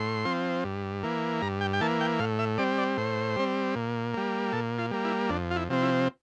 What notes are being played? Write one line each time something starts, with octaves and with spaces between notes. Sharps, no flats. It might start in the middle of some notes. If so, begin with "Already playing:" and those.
Already playing: A2 C6
F3 C4
G2
E3 A#3
G2 A#5
G5
G5
E3 A#3 A5
G5
A2 F5
E5
G3 C4 D5
D5
A2 C5
G3 C4
A#2
G3 A#3
A#2 A4
F4
G3 A#3
E4
F2 D4
F4
E4
C3 F3 C4
E4